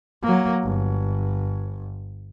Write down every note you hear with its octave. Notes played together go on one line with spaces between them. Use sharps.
F#3 A#3
G1